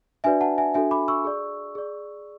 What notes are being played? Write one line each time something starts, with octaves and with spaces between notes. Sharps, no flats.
D4 F#4 B4 D5 E5 G#5
F#5 A5
E5 G#5
D4 F#4 A4 E5 G#5
B5 D6
C#6 E6
G#4 D5
G#4 D5